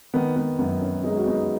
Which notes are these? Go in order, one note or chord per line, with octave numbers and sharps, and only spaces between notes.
D#3 B3
B3
F#2 B3
C#4
G#3 B3 D#4
F#4
B3 D#4